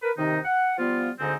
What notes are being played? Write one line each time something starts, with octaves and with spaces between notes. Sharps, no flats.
A#4 B4
D#2 C3 D#3 D#4
F#5
F3 G3 B3 F4
D2 G#2 D3 C4 D#4 G#5